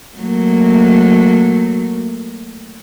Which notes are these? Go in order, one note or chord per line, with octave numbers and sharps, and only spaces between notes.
F#3 A3 A#3